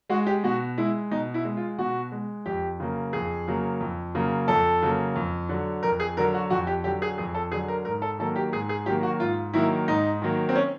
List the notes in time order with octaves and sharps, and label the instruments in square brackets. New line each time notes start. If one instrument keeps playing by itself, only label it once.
[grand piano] G#3 F#4
G4
B2 F#4
G#3 E4
B2 D#4
E4
G#3
F4
B2 F#4
G#3
F2 G4
C#3 F#3 A#3
F2 G#4
C#3 F#3 A#3
F2
C#3 F#3 A#3
F2 A4
C#3 F#3 A#3
F2
D3 F#3
F2 A#4
G#4
D3 F#3 A#4
F#4
F2 F#4
G4
D3 G4
F#3
G#4
F2 G#4
A4
D3 F#3 G#4
A#4
G#2 A#4
A4
D#3 F#3 A#3 A4
G4
G#2 G#4
G#4
D#3 F#3 A#3 G4
F#4
G#2 F4
D#3 F#3 A#3 E4
G#2 D#4
D#3 F#3 A#3
C4
C#4